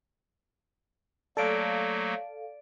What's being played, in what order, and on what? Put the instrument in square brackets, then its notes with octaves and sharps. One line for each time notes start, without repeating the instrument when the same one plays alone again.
[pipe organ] F#3 A3 A#3 [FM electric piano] A4 F5 [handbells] D5 D7